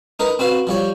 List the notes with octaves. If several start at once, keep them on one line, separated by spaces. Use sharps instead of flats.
D#4 A#4 B4
C4 F#4 B4 F5
F3 G3 C#5